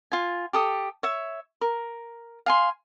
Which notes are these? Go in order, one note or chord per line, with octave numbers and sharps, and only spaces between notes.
F4 G#5
G4 A4 D#6
C#5 E5
A#4
F5 G#5 C6